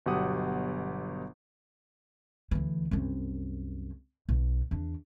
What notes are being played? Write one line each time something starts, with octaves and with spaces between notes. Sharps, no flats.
G1 B2 F#3 G4 F#5 D#6
D2 E3
C2 F#2
B1
E2 D4